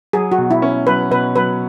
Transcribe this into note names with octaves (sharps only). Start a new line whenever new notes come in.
F#3 G#4
F#4
B2
E4
C#4
F#3 B4
B2 B4
F#3 B4